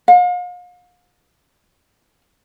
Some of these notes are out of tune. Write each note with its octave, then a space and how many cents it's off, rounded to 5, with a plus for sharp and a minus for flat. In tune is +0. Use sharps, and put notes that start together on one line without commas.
F5 +40